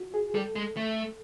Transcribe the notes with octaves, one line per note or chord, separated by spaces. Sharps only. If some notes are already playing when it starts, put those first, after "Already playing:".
Already playing: F4 F#4
G#4
G3 A4
G#3
A3